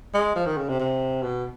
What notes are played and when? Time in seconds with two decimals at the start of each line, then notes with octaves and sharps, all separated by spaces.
0.14 G#3
0.35 F3
0.46 D#3
0.57 C#3
0.69 C3
0.80 C3
1.23 B2